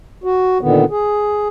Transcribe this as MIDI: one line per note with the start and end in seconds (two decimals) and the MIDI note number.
0.24 0.58 66
0.61 0.85 46
0.61 0.85 50
0.61 0.85 51
0.61 0.85 59
0.90 1.48 68